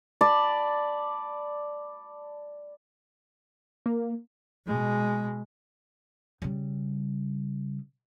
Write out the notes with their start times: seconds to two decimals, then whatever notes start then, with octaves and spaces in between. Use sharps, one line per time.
0.21 D5 A5 B5
3.86 A#3
4.66 B2 G#3
6.42 C#3 G3